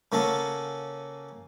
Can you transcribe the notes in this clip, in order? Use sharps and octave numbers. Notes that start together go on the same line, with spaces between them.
C#3 A#3 C#4 F#4 A4